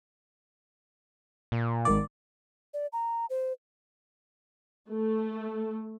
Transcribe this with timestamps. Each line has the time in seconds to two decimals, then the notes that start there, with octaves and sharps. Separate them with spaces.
1.52 A#2
1.85 G#1 D#3 D5
2.74 D5
2.93 A#5
3.30 C5
4.90 A3